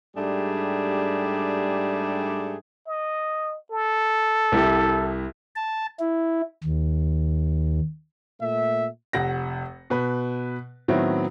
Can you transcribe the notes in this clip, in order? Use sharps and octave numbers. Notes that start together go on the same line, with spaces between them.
G#2 G3 A3 D4 G4 G#4
D#5
A4
C2 E4 G4
A5
E4
D#2
A#2 A3 E5
F1 F#5 A#6
B2 B4
A2 D#3 F#3 B3 C4 E4